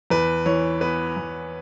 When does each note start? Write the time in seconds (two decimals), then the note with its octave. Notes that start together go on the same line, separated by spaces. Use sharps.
0.10 E2 B4
0.46 E3 C#5
0.81 B3 B4
1.17 E2